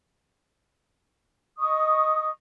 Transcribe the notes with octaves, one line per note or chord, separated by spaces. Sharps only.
D#5 C#6 D#6